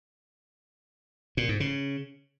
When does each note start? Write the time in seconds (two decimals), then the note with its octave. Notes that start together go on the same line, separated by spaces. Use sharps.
1.37 A#2
1.49 G#2
1.60 C#3